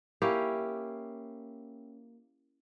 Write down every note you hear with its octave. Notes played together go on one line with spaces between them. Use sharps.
A#3 C#4 E4 G4